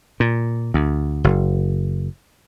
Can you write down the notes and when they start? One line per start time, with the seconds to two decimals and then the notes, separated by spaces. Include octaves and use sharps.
0.20 A#2
0.74 D2
1.24 F#1